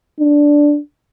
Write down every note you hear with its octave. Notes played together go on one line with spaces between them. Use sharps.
D4